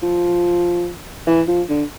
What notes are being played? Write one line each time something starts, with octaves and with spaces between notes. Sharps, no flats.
F3
E3
F3
D3